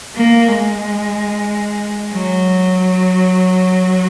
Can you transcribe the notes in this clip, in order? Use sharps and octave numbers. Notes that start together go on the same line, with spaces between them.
A#3
G#3
F#3